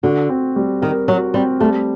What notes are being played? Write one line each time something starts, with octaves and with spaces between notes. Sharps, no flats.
D3 F#4
C4
G3
D#3 A#4
F#3 F#4
G3 C4
G3 A3